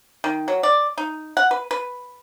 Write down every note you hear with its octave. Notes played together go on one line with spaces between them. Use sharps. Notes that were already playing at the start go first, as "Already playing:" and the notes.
D#3
F#3
D5
D#4
F#5
B4
B4